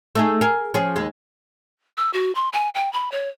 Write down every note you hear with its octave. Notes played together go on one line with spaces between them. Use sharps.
A3 D#4 G#4
G#4 A#4
F3 C#4 G#4
D#2 G#3
E6
F#4
C6
G#5
G5
B5
C#5